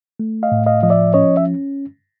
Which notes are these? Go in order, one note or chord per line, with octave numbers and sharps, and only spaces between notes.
A3
D#5 F5
A2
D#5 F5
F3 D#5
D5 E5
C#4 C#5 D#5
E5